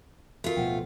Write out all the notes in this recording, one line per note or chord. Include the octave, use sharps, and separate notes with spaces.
A3 F4 F#4 A#4
D1 B2 F3 F#5 G5